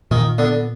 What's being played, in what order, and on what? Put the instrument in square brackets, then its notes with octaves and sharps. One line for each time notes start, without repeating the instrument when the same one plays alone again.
[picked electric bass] A#2 [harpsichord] D#3
[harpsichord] D3 [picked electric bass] B3